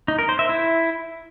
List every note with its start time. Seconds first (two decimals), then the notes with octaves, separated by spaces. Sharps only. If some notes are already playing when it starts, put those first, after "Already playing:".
0.08 D#4
0.19 A#4
0.29 C5
0.39 E5
0.49 E4